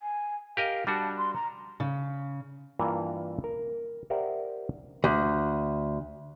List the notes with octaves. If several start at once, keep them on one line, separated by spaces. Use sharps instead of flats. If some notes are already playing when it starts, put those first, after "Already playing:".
G#5
G4 A#4 D#5 F5
G3 D4 F#4 A5
C6
A#5
C#3
G2 E3 A#3 F4 A#4 A#5
A#4
G4 A#4 C5 D5 E5 F#5
D2